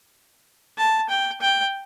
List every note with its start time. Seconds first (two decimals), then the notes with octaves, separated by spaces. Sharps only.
0.78 A5
1.09 G5
1.41 G5